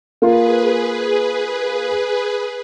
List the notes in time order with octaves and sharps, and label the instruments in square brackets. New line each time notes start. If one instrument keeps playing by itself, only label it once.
[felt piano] A#3 F4 A#4 [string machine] G#4 B4